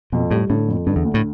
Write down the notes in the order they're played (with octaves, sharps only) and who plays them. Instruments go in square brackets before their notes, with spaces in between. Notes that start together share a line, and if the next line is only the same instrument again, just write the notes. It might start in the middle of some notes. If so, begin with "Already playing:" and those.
[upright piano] F2 [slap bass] B2
[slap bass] A2 [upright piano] G3
[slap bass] A2 [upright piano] D3
[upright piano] F2
[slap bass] G2 [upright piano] D3
[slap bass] E2
[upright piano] D2
[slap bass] A2